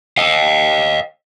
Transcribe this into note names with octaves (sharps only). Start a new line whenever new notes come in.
D#5 F5